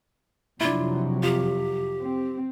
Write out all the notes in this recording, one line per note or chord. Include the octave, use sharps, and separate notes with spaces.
F2 C3 F#3 D4 E4 F4
F4 G4
C4